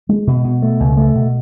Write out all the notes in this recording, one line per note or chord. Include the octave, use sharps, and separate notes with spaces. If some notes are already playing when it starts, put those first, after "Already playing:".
G#3
B2
B2
A3
C#2
A3
B2